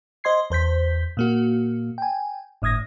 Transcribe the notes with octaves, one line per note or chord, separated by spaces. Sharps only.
C5 D#5 C6 G#6 C7
E2 C5 G6 B6
A#2 A#3 F#4
G5 G#5
G1 A2 D#6 G#6 A#6